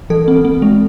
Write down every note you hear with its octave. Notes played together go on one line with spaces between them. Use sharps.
E3 A4
C4
C4
G#3